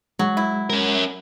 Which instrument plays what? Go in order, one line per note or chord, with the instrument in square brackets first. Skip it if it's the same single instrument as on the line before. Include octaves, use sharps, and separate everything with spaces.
[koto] F#3 [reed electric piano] G#3
[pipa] E4
[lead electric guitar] C#4 A#4